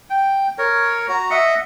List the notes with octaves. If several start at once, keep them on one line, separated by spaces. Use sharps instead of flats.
G5
A#4 C#5
F#4 A#5
D#5 E5 F#5